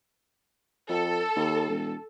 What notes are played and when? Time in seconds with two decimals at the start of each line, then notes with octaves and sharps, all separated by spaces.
0.89 F2 A4
1.36 D#2
1.69 E1